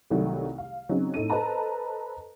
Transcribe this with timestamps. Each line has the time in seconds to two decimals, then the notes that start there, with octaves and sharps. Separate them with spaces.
0.10 C2 D#3 F#3 G3 A3
0.58 F5
0.89 C#3 F#3 C4 C#4 D#4
1.14 A2 D#4 A4 D#7
1.30 A4 B4 C5 D#5 A5 A#5